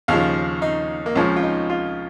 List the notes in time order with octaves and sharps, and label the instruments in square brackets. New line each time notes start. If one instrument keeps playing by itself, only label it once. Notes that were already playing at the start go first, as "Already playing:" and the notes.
[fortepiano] D#2 C#3 F3 F5
D#4
A#3
C#2 C#3 F3 C#4
F4
D#4
F4